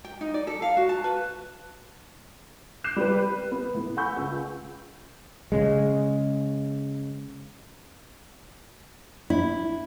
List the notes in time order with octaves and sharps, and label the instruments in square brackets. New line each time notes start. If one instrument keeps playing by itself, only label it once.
[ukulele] G5
D#4
D5
A4
F5
F#4
A5
B4
[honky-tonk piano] D6 F#6 G6 C7 E7
G3 G4 B4
B3
A2
F#5 G#5 B5 C#6 E6 G6
C#2
[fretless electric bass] C#3 G#3
[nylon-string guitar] E4